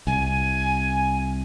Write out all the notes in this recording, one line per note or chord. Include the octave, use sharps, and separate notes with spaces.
C2 G#5